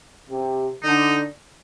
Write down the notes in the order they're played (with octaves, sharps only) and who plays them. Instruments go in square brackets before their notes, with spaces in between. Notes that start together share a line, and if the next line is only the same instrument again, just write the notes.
[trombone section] C3
[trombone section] D3 [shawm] D#4